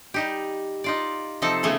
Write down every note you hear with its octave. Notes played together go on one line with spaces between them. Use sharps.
G3 D#4 G4
D#4 F4 D5
C3 F3 C4 D#4 A4 A5
C#3 A3 B3 G#5